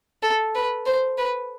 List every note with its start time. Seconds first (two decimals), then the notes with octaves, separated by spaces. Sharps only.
0.23 A4
0.55 B4
0.86 C5
1.18 B4